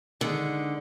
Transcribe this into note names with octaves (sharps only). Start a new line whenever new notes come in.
D3 D#3 G#3 D#4 G#4